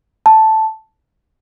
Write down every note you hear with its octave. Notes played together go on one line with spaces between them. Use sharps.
A5